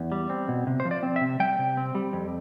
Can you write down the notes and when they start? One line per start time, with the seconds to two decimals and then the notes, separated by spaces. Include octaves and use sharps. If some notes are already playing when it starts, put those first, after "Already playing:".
Already playing: E2
0.12 G3
0.30 C4
0.48 B2
0.67 C3
0.80 C5
0.85 F3
0.91 D5
1.03 C4
1.16 E5
1.21 C3
1.40 G3 G5
1.59 C3
1.77 C4
1.95 G3
2.13 F2